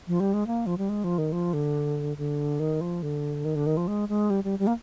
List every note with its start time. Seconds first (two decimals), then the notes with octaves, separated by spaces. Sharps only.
0.07 F3
0.20 G3
0.34 G#3
0.47 A#3
0.66 F3
0.78 G3
0.89 G#3
1.04 F3
1.18 D#3
1.32 F3
1.53 D3
2.17 D3
2.60 D#3
2.81 F3
3.03 D3
3.45 D#3
3.56 D3
3.66 D#3
3.77 F3
3.88 G#3
4.09 G#3
4.30 G3
4.44 G3
4.59 G3
4.67 A#3